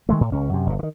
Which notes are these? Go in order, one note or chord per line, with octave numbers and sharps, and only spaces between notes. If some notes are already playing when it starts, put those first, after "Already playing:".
D#3 G#3 A3
A2
C#2 C#4
F#2 C3
G1 A#2
D3 D#3